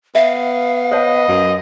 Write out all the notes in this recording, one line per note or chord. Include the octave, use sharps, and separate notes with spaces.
B3 E5 F5
C5 C#5 D#5 A5
F#2